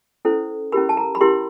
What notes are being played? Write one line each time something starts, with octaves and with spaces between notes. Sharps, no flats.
C#4 E4 A4 C5
C#4 E4 G4 A#4 B5
A5
A#5
B5
C#4 E4 G4 A#4 C6